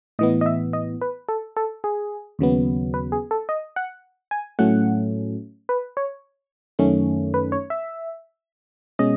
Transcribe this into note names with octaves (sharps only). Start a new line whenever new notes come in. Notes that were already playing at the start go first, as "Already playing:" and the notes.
A2 E3 B3 D#5
D#5
E5
D#5
B4
A4
A4
G#4
D#2 C#3 F#3 B3
B4
G#4
A4
D#5
F#5
G#5
A2 F#3 A3 C#4 F#5
B4
C#5
F#2 D#3 A3 C#4
B4
C#5
E5
B2 G#3 C#4 D#5